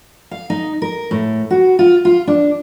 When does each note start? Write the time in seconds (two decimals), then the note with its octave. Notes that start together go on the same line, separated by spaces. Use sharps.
0.31 F5
0.50 D#4
0.82 A#4
1.11 A2
1.50 F#4
1.79 F4
2.05 F4
2.27 D4